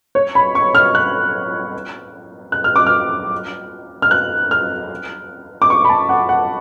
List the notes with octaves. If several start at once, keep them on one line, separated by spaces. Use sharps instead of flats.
C#5
B5
C#6
F6
F#6
F#6
F6
D6
F6
F6
F#6
F6
D6
C#6
B5
A5
F#5
F#5